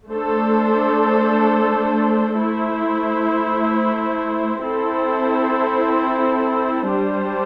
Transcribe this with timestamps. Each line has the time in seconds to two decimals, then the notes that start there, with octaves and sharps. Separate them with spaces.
0.10 A3 D4 A4 C5
2.37 A3 E4 C5
4.63 C4 E4 A4 C5
6.90 G3 D4 G4 C5